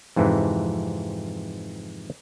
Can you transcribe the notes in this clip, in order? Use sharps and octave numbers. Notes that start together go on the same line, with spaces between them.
F2 G#2 C3 E3